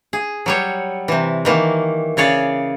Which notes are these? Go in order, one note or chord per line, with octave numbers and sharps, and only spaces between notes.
G#4
F#3 G3 C#5
C3 E3
D#3 E3 A#3
C#3 G#4 C#5 D5